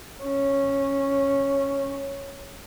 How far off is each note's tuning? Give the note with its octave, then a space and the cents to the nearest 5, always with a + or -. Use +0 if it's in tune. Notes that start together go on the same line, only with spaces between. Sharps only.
C#4 -5